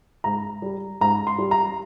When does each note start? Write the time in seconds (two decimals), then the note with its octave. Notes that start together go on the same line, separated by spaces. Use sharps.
0.24 G#2 A#5
0.62 G3
1.01 G#2 A#5
1.27 C6
1.38 G3
1.51 A#5